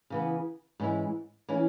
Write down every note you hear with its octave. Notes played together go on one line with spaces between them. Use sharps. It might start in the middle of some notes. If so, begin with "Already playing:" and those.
C#3 E3 B3
G#2 E3 C#4 E4
E3 C#4 E4